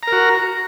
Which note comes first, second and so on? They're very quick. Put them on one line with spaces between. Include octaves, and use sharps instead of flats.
A#5 A#4 F#4